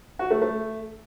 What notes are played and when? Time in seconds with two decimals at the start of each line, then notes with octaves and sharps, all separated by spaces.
0.19 F#4
0.31 A3
0.42 A3